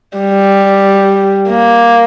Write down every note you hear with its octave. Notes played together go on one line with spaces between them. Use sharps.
G3
A#3